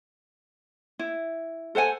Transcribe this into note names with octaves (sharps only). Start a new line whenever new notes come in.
E4
A4 C5 F#5 G#5